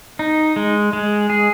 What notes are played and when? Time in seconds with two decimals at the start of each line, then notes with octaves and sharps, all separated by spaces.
0.19 D#4
0.56 G#3
0.93 G#3
1.30 G#4